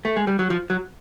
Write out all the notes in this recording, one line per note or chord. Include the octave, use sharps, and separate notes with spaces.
A3
G#3
G3
F#3
F3
F#3